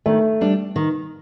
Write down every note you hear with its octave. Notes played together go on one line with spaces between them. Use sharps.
D#3 A3
G3 D4
D#3